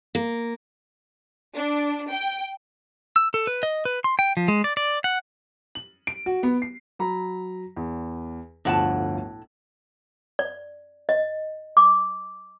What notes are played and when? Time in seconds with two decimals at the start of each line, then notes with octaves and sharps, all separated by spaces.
0.15 A#3
1.55 D4
2.11 G5
3.16 E6
3.34 A4
3.47 B4
3.63 D#5
3.85 B4
4.04 C6
4.19 G5
4.37 F3
4.48 G#3
4.64 D5
4.77 D5
5.04 F#5
5.75 F#7
6.07 D7
6.26 F#4
6.43 B3
6.62 C7
6.99 F#3 A#5 B5
7.77 E2
8.65 G1 D2 A2 F3 F#5 A5
10.39 D5
11.09 D#5
11.77 D6